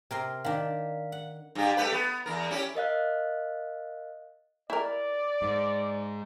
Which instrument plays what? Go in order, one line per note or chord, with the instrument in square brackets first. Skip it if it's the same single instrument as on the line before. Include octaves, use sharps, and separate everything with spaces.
[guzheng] C3 A#4 C6
[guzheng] D#3 D4 [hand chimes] F5
[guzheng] F#5
[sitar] G2 G4
A3 G4 B4
B3
E2 A#4
C#4 E4 G4
[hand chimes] A#4 D#5 F5 F#6
[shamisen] E4 A#4 [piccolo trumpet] D5
[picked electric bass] G#2